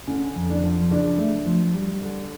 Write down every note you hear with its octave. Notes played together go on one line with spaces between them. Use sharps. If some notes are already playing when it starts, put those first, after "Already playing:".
D3 C#4
F2
D4
F3
C#3 D4
A3
F3
G3
D3